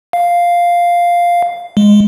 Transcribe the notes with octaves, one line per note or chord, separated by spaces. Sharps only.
F5
G#3